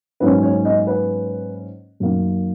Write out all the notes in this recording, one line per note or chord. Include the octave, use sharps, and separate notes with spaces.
G#2 F#3 A#3 C#4 B4
C#5
D#5
B4
F#2 D#3 A#3